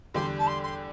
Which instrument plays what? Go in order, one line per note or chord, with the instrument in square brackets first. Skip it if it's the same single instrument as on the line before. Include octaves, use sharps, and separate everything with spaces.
[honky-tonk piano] E2 D3 G3 D4 G4 [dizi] C6
[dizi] A5
C6
C6